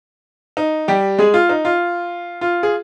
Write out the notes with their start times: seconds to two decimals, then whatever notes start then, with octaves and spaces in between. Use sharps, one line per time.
0.57 D#4
0.88 G3 G4
1.18 G#3 G#4
1.34 F4
1.49 D#4
1.65 F4
2.41 F4
2.63 G#4